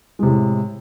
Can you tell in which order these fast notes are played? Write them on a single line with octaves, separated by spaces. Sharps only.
G#3 C3 A2